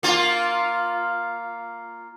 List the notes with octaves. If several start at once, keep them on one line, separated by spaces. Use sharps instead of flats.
A#3 F4